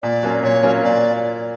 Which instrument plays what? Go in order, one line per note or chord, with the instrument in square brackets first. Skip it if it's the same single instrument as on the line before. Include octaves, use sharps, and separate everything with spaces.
[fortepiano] A#2 [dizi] D5
[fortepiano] F#3 A#3 C#4 F4
[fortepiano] A#2 [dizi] C#5
[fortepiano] F#3 A#3 C#4 F4
[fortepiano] A#2 [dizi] D5